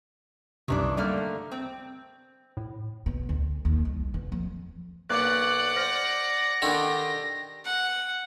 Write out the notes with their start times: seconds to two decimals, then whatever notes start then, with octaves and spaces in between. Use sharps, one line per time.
0.68 C2 F#2 C3 D#3 E3 D4
0.97 D3 G3 A3 A#3 F6
1.52 C4
2.57 A2
3.06 B2
3.29 D2
3.65 D#2
3.85 C2
4.14 B2
4.32 F2
5.09 B1 A#3 D5 F#5 D6 F#6
5.76 C5 F6 A#6
6.62 D3 D#3 D4 G4 A4
7.65 F#5